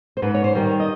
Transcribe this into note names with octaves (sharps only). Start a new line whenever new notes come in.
C5
G#2 B4
C#5
C5
D#3 G3
C#5
D#5